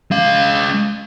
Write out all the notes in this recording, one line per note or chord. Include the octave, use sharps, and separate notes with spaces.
G#3 F5